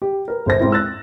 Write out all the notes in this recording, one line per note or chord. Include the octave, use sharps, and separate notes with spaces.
G4
A#4 B4
G1 C5 A#6
G#2 C4 E4
E6 F#6 A6 A#6